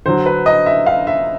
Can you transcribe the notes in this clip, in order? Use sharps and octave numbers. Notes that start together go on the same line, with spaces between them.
D3 F#3 C5
B4
D#5
E5
F5
E5